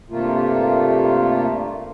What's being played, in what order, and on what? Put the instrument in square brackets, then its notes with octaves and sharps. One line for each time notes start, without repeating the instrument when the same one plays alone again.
[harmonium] G2 C3 A3 A#3 F4